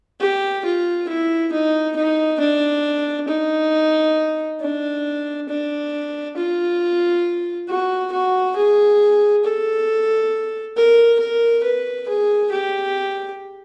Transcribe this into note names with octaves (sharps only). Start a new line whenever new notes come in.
G4
F4
E4
D#4
D#4
D4
D#4
D4
D4
F4
F#4
F#4
G#4
A4
A#4
A#4
B4
G#4
G4